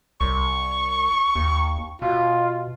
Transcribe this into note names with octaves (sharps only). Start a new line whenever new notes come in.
C2 C#6
D#2
B2 F4